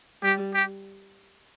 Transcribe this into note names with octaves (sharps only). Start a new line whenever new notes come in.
G3 G4
G4